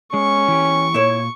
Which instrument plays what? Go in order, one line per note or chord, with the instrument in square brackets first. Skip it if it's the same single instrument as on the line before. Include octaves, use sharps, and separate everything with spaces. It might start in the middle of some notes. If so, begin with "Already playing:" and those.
[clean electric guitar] G#3 [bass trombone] C#4 [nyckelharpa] C#6
[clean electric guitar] E3 G4
[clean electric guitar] A#2 [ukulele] E4 C#5